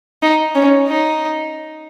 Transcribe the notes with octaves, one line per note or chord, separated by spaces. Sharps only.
D#4
C#4
D#4